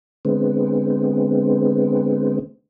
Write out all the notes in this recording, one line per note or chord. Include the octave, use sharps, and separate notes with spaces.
D3 G#3 B3 C4